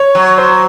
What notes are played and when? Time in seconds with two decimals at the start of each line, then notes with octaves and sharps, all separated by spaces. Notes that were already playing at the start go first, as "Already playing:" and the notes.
Already playing: C#5
0.15 F#3
0.38 C5